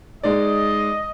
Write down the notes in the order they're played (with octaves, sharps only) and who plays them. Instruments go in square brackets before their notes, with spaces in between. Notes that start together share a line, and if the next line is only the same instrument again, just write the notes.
[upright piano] G#3 D#4 D5 [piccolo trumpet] D#5